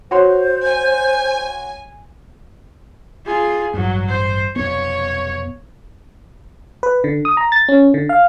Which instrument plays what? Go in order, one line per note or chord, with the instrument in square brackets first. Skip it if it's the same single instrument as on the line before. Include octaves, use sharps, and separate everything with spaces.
[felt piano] F#4 C#5 C6 [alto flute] C5
[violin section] G#5
[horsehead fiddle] F4 G#4
[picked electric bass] A1 G2 [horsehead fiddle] F#3
[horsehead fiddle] C5
[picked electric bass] F1 B1 B3 [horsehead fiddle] C#5
[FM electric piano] B4
D3
D#6
A#5
A6
C#4
D3
F5